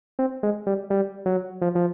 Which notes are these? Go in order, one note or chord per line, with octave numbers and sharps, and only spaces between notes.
C4
G#3
G3
G3
F#3
F3
F3